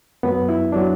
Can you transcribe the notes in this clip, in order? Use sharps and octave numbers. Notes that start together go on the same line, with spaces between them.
F#2 F#3 B3
E4
F#3 D4